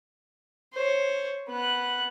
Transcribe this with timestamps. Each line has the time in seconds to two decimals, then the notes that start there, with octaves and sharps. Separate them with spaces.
0.73 C5 C#5
1.48 B3 F#6